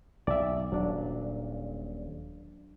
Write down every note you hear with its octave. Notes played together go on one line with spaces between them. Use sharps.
B1 D5 E5
D#1 A#2 F#3 D4